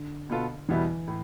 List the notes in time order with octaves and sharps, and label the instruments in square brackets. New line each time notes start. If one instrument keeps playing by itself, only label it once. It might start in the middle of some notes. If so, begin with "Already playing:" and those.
Already playing: [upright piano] D3
[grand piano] B2 B3 F4 A4
[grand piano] E2 B2 G3 B3 E4 [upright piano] E3
[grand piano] A2